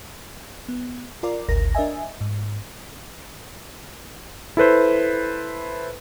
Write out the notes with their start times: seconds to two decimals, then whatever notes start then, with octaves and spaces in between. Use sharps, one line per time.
0.69 B3
1.23 F4 A#4 D5
1.49 G#1 D2 A#4 A#6
1.75 D4 A#4 D#5 E5 G#5
2.21 G#2
4.57 E4 A4 B4 C5